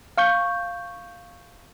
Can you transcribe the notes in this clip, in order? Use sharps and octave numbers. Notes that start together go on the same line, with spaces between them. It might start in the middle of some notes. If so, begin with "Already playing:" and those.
F5 C#6 G6